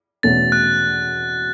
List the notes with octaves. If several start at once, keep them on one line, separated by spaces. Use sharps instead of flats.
E2 B2 A3 C#4 A4 A6
F#6